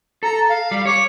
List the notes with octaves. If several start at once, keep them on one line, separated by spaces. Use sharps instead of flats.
A4 A#5
F5
G3
C#5 D6